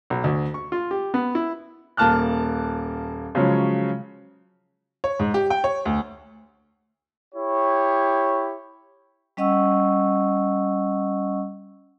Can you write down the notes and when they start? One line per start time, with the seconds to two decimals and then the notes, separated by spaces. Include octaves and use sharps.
0.10 B1
0.24 D2
0.54 C#6
0.72 F4
0.91 G4
1.14 B3
1.35 E4
1.97 D#1 A#3 A5 F6 F#6
3.35 C#3 F3 F#3 G#3 C#4
5.04 C#5
5.20 G#2
5.34 G4
5.50 G5
5.64 C#5
5.85 D2
7.34 E4 G4 C#5
9.37 G3 C#4 D#5 F#5 C#6 E6